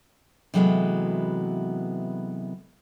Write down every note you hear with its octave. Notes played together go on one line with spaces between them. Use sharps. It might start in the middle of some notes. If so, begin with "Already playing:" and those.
C3 E3 F#3 G#3 A3 B3